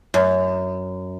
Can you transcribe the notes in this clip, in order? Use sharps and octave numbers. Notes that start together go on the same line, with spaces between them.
F#2